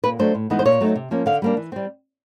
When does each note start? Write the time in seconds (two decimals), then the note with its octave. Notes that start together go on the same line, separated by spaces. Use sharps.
0.04 A#2 B4
0.19 F#3 A3 D4 C5
0.35 A2
0.50 E3 G#3 B3 D#4
0.59 C5
0.65 A#2 C#5
0.80 F#3 A3 C4 D#4
0.95 C3
1.11 F3 A#3 C#4
1.26 D3 F5
1.42 G3 A#3 D4
1.57 E3
1.72 G3 C4